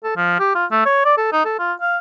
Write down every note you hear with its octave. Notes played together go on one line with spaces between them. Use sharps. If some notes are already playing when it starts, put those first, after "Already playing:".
A4
F3
G4
F4
A3
C#5
D5
A4
D#4
A4
F4
F5